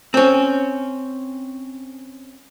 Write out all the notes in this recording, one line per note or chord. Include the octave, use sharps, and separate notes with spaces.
C4 C#4